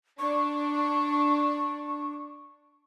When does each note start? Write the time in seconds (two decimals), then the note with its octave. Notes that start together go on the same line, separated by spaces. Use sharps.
0.19 D4 C#6